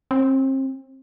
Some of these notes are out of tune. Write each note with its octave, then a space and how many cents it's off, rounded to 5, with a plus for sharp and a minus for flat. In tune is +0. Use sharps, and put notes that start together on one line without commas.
C4 +35